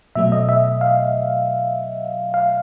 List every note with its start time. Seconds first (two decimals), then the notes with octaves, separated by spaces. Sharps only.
0.15 B2 F#3 A3 E5
0.32 D#5
0.49 E5
0.81 F5
2.34 F5